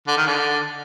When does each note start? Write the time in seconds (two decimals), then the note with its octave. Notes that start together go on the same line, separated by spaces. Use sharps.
0.07 D3
0.17 D#3
0.27 D3